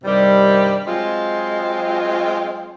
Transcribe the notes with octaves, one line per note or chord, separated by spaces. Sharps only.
G2 C3 D#3 G3
F#3 G#3 C4 F4